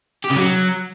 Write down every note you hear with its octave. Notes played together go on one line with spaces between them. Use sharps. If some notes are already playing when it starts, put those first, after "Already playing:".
G4
C#3
F#3